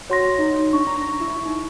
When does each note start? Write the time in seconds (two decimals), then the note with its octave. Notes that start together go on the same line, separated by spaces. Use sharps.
0.10 F#4 C#5 C6 A#6
0.38 D#4
0.73 D4 C#6
0.87 A#5
1.20 E4
1.46 D#4